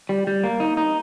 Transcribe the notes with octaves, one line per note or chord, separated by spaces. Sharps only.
G3
G3
A#3
D#4
D#4